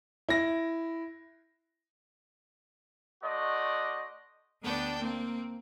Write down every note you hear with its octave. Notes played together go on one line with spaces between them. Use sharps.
E4 A#6
A3 F#4 C5 D5 D#5
D2 B3 D4 G5 A5
A#3 C4